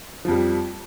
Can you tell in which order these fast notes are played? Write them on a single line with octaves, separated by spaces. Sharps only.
F3 F2 G3